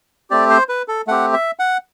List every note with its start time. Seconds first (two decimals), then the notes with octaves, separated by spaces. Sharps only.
0.30 A3 C4 G4 D5
0.50 C5
0.69 B4
0.88 A4
1.07 A3 C4 G4 F#5
1.33 E5
1.59 F#5